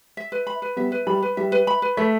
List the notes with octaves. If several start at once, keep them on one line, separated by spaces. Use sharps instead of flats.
E5
B4
B5
B4
G3 B3 E5
B4
G3 B5
B4
G3 E5
B4
B5
B4
A3 E5